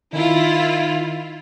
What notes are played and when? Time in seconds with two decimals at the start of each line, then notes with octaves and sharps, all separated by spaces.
0.13 D#3 E4 F4